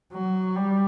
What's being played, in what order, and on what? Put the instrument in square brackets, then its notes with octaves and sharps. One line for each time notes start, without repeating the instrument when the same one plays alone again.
[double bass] F#3
G3